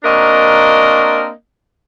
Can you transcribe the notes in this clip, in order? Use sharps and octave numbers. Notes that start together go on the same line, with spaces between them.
A#3 C4 D4 F#4 A#4 D#5